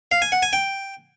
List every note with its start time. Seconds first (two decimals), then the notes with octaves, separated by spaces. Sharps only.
0.12 F5
0.22 G#5
0.32 F#5
0.43 G#5
0.53 G5